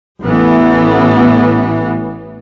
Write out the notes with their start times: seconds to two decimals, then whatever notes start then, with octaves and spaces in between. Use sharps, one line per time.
0.23 A1 E3 B3